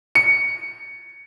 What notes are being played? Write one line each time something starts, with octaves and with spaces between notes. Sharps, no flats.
C#7